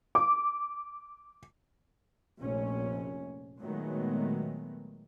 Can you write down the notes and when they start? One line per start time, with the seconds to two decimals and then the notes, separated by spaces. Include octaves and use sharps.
0.15 D6
2.40 F1 A#1 C#4
3.59 A#2 D#3 F#3 G#3 A3 B3